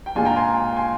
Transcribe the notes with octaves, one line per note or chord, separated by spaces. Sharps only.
G5
A#2 G#3 D4 F4 G#5
G5 A#5
G#5 C6
G#5 C6